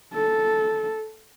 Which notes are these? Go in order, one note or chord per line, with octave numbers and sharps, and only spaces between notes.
A4